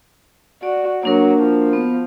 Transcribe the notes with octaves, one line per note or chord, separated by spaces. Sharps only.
F#4 D5
F#3 A#3 D4 A#4
F3
B3